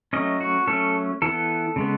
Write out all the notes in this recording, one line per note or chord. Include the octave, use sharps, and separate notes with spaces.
F#3 A3 C#4 D#5
F#4
F#3 A3 C#4 A4
E3 B3 A4
C#3 G#3 B3